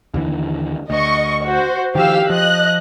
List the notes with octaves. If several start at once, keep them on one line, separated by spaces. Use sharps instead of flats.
D#2 D3 E3
D2 D#5 C#6
F#4 C5
D#3 F3 G4 F5 E6
F3 D#5 F#6